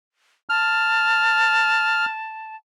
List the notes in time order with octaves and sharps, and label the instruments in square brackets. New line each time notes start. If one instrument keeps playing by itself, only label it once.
[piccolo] A5 [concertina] F6